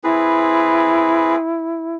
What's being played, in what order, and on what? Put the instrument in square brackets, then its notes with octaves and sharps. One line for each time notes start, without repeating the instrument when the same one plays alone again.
[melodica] C4 G#4 B4 [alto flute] E4